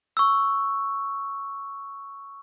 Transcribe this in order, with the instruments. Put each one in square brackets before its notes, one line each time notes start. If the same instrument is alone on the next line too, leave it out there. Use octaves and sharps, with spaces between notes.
[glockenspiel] C#6 E6